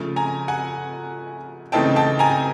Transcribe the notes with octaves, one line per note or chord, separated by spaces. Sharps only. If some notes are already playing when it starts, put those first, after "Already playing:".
Already playing: C#3 F3 A3
G#5 A#5
F#5 G#5
C#3 E3 A3 C4 D#4 G5 A5
G5 A5
G#5 A#5